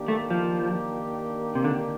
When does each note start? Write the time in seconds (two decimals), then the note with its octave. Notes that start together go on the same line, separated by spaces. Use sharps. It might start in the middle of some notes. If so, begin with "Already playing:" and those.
Already playing: D#3 A#3 D4 G4
0.08 A3
0.30 F3
1.55 C3
1.64 D3